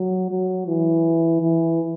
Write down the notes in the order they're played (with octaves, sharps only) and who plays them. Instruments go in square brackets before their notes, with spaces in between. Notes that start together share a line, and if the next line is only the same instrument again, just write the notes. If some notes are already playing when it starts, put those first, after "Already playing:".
Already playing: [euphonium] F#3
F#3
E3
E3